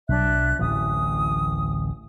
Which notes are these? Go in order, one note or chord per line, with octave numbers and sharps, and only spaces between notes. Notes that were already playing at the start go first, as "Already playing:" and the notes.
B1 F#3 D4 E5 F#6
D1 A1 E3 D#6